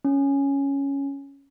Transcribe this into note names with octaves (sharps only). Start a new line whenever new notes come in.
C#4